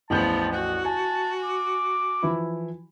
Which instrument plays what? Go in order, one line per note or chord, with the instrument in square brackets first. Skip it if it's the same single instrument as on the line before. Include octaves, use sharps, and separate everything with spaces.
[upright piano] A1 E2 G6 [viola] F3 B3 [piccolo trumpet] A5
[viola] F#4 [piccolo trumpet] F#5
[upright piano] G#5 [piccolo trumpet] A5
[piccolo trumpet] D6
[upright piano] E3 F3 E4